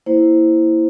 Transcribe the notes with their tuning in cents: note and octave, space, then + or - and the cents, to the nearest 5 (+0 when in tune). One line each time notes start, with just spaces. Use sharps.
A#3 +0 E4 +0 C5 +0